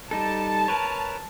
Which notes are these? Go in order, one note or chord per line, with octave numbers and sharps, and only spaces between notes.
G3 D#4 A4 A5
A#4 B4 C#5